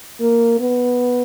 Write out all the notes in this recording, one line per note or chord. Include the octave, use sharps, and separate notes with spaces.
A#3
B3